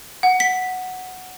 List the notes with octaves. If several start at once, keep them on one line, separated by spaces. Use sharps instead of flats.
F#5
B6